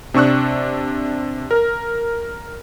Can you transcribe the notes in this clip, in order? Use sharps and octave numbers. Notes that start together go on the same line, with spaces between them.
C3 D4 C#6 E6 F#6
A#4